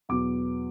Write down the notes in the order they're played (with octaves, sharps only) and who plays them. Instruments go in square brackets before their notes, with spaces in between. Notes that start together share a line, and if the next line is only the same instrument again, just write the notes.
[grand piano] E2 B2 F#3 B3 D6